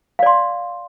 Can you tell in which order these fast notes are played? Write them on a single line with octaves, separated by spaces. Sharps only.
F5 D5 C6